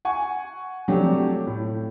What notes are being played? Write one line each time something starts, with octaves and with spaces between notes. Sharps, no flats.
F#5 G#5 C#6
F3 F#3 A3 C4 D4 G4
A2